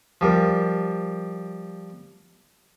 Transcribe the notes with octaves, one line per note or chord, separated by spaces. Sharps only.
F3 G3 A#4